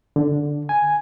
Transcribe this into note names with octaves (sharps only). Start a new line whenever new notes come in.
D3
G#5